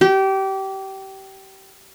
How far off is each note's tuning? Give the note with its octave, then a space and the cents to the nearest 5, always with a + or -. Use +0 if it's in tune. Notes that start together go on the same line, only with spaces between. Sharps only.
G4 -25